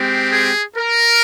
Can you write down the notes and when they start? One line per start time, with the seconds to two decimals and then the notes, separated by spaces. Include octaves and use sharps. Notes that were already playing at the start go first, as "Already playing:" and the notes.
Already playing: G#3 C4 G4
0.31 G#4
0.77 A#4